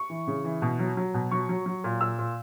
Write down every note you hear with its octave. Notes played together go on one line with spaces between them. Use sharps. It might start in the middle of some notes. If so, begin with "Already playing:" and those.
Already playing: C#6
E3
C#3
E3
B2
F#3
F#3
B2
F#3 C#6
F#3
F#3
A#2
A#2 E6
A#2